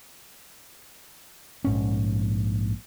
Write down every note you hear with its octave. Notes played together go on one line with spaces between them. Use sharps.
A#1 G#2 C#4